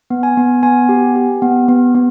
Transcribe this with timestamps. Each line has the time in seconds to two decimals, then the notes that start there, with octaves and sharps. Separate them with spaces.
0.10 B3
0.23 G#5
0.37 B3
0.63 B3 G#5
0.89 G4
1.16 G4
1.42 B3
1.68 B3
1.95 B3